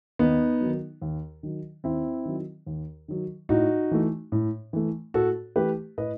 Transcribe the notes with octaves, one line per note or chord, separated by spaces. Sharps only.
D#2 B3 D#4
D#3 F#3
D#2
D#3 F#3
D#2 C4 E4
D#3 F#3
D#2
D#3 F#3
A2 D#4 F#4
E3 A3
A2
E3 A3
A2 F#4 A4
E3 A3 G4 B4
A2 B4 D#5